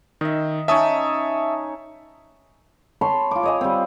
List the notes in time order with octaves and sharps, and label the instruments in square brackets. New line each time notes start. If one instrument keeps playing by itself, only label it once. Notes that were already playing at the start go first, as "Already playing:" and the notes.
[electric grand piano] D#3 [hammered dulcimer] D#5 E5
[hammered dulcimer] C#4 D#4 C#5 [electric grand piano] E5 A5 D#6
[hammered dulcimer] C#5 A5 B5 C6
F4 D6
C#5 D#5 G#5
G3 C4